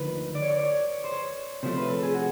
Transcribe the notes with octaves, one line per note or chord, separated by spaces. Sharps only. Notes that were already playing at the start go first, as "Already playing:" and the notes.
Already playing: D2 D3 F3 A#3 D#4 B4
D5
C#5
D5
C#5
C5
C#5
C3 F3 A3 C5
B4
A4
G#4
F#4